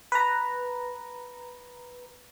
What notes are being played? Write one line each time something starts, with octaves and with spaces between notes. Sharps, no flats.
B4 A#5